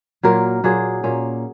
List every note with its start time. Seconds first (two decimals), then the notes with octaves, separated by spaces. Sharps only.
0.23 A#2 F#3 A#3 A#4
0.64 A#2 F#3 A#3 G#4
1.04 A#2 A#3 C#4